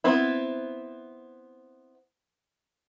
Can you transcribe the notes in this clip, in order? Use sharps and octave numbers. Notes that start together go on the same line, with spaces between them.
B3 C4 E4